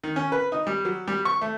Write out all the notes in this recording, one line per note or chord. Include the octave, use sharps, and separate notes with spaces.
D#3
C#4
B4
D#4
G3
F#3
G3
C#6
A3